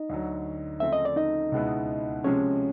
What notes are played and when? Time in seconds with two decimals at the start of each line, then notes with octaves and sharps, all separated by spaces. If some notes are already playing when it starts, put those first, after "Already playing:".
Already playing: D#4 D#5
0.10 D2 D3 F#3
0.80 C#3 F3 A3 C4 E5
0.93 D#5
1.05 D5
1.16 D#4 D#5
1.52 C#2 B2 G#3 B3 E4
2.24 C3 F3 G#3 C#4 C#5